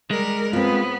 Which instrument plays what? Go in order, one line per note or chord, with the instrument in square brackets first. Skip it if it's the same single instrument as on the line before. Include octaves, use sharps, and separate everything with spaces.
[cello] G3 A#4 [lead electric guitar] G#3
[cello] B3 [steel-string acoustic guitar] C4 F4